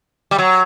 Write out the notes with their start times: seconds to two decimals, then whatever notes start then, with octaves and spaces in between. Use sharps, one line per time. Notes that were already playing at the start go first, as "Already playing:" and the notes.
0.31 G3
0.38 F#3